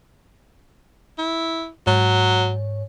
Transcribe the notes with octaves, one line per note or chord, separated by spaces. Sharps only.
E4
G#2 F#3 C#5